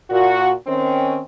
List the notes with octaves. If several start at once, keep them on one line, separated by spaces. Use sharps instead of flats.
A#2 F#4
D#3 C4 C#4